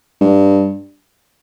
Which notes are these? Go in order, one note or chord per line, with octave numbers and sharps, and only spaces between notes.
G2